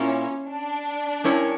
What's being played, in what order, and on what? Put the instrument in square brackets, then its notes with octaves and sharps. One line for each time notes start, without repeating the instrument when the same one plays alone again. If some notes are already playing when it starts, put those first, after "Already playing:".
Already playing: [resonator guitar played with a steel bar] A#2 A#3 E4 [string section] C#4
[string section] D4
[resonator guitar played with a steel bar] G3 C#4 E4 A#4 C#5